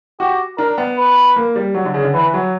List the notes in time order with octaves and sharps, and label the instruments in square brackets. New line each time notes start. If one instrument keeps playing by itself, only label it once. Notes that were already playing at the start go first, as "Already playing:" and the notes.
[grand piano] F#4 [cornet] G4
[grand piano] D4 [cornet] A#4
[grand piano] B3
[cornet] B4
[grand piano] A#3
G3
F#3
D3
C#3
D3
[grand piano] E3 [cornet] B4
[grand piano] F#3